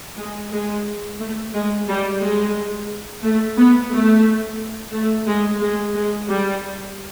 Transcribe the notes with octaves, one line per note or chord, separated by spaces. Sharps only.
G#3
G#3
A3
G#3
G3
G#3
A3
B3
A3
A3
G#3
G#3
G#3
G3